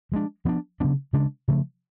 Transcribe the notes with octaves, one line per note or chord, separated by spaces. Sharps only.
F3 G#3 D4
F3 B3 D4
C#3 F#3 B3 D4
C#3 G#3 D4
C#3 F3 A3